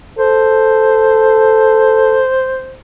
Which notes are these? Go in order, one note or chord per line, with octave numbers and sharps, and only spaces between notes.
A4 C5